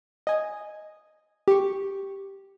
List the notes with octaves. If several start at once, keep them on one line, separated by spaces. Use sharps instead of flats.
D#5 G#5
G4 C#6